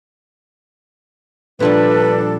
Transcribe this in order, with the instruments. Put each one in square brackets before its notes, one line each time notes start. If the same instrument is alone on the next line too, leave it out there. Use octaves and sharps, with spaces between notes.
[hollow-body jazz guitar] A#2 F3 G3 [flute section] D4 [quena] A4 [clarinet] B4